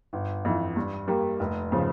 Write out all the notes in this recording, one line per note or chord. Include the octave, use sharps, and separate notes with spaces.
G1
F2 E3
G2
G3 A#3
F1
C#3 F3